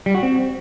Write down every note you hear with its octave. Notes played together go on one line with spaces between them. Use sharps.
G3
F#4
C4